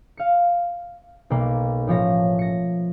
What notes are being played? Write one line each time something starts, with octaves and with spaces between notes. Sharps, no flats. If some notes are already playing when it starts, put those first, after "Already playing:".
F5 C#7
B1 A#3
A1 F3 C#5 A#6
A#6 C#7